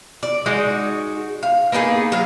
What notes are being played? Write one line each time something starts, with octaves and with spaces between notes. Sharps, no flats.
D5
G#3 D#4 F#4
F5
A#3 B3 D#4 G#4
F#3 F5